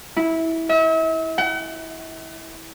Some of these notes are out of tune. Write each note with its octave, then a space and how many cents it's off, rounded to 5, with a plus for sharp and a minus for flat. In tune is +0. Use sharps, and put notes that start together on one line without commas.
E4 -15
E5 -40
F#5 +40